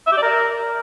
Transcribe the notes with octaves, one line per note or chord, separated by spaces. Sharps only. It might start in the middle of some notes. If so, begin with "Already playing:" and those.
E5
G4
D5
A#4